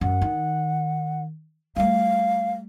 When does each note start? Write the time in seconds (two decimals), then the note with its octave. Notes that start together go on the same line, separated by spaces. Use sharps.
0.01 F#2 F#5
0.22 D#3
1.76 G3 A3 F5